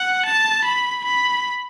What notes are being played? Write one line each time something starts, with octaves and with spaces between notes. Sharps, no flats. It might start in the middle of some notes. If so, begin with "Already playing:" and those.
Already playing: F#5
A5
B5
B5